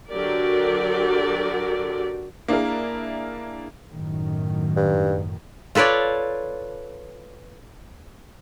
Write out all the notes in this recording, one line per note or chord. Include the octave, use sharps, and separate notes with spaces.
D3 F#3 F#4 G4 A#4 D5
A#3 D4 E4 G#4 A#4
F#2 A2 D#3
G2
F4 A4 B4 C#5 D5